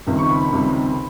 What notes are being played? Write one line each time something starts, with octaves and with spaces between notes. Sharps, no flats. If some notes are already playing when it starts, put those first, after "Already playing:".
C#2 C3 D#3 G3
C#6
B5
B5
C#2 C3 D#3 G3